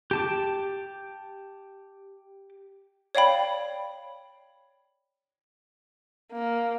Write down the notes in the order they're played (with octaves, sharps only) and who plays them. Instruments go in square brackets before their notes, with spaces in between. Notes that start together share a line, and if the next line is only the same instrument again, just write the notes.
[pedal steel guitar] G4 A5 D6
[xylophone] C#5 D5 F5 G5 B5
[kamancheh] A#3